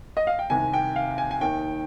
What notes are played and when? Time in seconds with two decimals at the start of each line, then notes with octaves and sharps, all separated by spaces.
0.17 D#5
0.27 F5
0.39 G5
0.50 C2 C3 D#3 G#5
0.73 G5
0.96 F5
1.18 G#5
1.31 G#5
1.41 D#2 D#3 G5